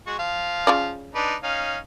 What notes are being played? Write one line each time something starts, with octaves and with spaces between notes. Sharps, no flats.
G#3 F#4 C#6
F3 F5
C#3 F4 D5
D4 D#4 B4
C#4 D#4 F5